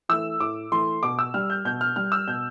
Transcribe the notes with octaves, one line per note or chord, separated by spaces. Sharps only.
E3 A3 E6
A2 D6
E3 A3 C6
B2 D6
E6
G3 F6
G6
B2 G6
F6
G3 F6
E6
B2 G6